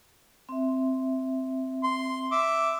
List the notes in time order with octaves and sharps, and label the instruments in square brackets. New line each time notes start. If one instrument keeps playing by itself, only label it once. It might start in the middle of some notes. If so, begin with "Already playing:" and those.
[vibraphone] C4 E5
[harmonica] C6
E5 D6